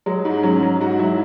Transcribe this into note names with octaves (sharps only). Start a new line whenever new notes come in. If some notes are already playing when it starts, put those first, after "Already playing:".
F#3 G#3
G#2
F#3 C#4
F#3
G#2 F#4
F#3 E4